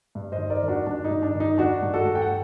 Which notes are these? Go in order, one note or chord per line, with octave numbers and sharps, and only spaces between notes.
G2
C5 D#5
D#3
A#4 D5
D#3
D4 F#4
G2 D4
D#4
G2
D4
D#3
D#4
D#3 D4 F#4
G2
F#4 A4
G2
G5
F#5